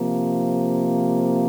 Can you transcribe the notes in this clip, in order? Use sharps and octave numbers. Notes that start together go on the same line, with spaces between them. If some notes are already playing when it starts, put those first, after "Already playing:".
Already playing: C3 F3 A#3